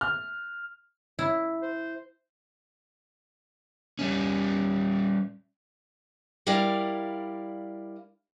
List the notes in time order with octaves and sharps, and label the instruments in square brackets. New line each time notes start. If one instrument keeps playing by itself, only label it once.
[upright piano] F6
[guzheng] E4
[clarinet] C5
[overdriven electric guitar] G3 C#4
[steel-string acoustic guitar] G3 E4 A#4 D5 F5